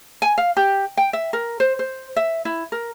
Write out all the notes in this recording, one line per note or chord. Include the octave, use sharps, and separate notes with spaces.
G#5
F5
G4
G5
E5
A#4
C5
C5
E5
E4
A#4